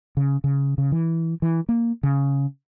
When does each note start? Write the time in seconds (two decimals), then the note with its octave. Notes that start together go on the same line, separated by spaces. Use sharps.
0.17 C#3
0.44 C#3
0.78 C#3
0.92 E3
1.42 E3
1.69 A#3
2.03 C#3